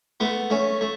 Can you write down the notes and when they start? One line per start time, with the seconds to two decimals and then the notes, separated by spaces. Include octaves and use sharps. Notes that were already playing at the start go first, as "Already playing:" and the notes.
0.20 A3 B3
0.50 A3 C#4
0.81 A3